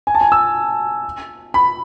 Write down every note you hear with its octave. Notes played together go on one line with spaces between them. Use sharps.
G#5
A5
G#5
E6
B5